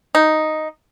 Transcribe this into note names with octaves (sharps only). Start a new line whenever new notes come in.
D#4